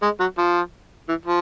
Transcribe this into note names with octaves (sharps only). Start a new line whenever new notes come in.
G#3
F#3
F3
E3
F3